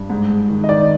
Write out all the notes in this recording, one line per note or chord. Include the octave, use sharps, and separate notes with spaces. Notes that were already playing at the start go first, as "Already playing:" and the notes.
Already playing: G2
G#2
G#2
D#3
D#5
D#3 D5